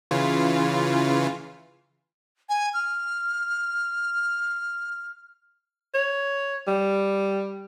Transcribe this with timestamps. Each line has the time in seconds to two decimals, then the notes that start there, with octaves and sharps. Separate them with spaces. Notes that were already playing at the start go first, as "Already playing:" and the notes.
0.11 C#3 E3 F4
2.49 G#5
2.74 F6
5.95 C#5
6.68 G3